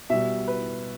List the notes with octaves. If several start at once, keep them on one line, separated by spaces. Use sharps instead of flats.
B2 G3 E5
B4